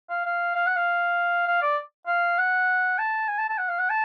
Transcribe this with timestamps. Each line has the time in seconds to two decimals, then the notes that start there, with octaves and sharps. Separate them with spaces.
0.10 F5
0.26 F5
0.55 F5
0.66 F#5
0.76 F5
1.47 F5
1.62 D5
2.07 F5
2.38 F#5
2.98 A5
3.28 G#5
3.39 A5
3.49 A5
3.58 F#5
3.69 F5
3.79 F#5
3.90 A5